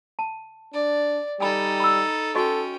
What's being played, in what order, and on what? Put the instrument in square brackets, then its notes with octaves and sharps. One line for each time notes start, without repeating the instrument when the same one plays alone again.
[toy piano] A5
[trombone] D4 [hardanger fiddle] D5
[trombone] G3 [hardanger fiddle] D#4 A4 [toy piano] G5 G#5 B5
[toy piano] B5 E6
[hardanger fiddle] C#4 G5 [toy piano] F#4 D#5 C#6 [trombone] A4